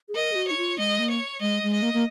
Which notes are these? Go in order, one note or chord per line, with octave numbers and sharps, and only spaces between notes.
G#4
A#4 D#5
G#4
F#4
D#4 C#5
F4
G#3 D#5
A#3
C#5
G#3 D#5
G#3
D#5
A#3
A#3